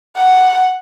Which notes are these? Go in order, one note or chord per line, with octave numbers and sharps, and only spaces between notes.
F#5